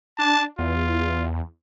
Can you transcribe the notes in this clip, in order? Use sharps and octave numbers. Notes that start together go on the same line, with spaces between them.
D4 A5
E2 F4